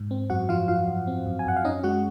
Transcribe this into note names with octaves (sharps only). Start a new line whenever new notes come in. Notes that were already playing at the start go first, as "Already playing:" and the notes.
Already playing: G#2
C4
F#2 F#4 F#5
F3 F4 F5
F#2 F4 F5
F#2
C4
F#2
G#5
F#2 F#5
F5
C#4 D#4 D#5
G#3 F#4 F#5